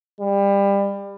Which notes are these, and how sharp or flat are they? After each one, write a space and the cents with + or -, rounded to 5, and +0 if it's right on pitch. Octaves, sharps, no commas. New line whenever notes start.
G3 +25